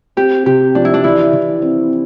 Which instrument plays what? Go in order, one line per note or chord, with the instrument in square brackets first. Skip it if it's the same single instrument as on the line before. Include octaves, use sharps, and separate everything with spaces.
[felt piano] C4 [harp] G4
[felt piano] C3 [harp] G4
[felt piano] F3 [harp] D4
[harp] E4
D4
[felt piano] E3 [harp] E4
[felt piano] E3
C4